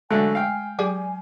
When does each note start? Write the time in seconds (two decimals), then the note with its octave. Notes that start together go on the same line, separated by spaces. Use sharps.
0.11 D3 F#3 G#3 A3 G#5
0.35 F5 G5
0.79 F#3 G4 G#4 D5 G#5 D6